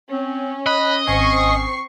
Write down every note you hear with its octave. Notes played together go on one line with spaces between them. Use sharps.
C4 C#4
D#5 B5 F#6
G#1 C4 C#4 G#5 C#6 D#6 C7